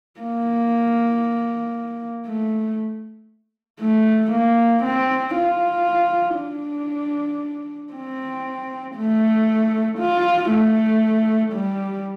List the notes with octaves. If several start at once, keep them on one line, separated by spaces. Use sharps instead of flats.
A#3
A3
A3
A#3
C4
F4
D4
C4
A3
F4
A3
G3